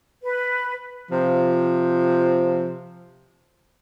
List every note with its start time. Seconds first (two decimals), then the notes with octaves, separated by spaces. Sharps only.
0.23 B4
1.11 C3 F3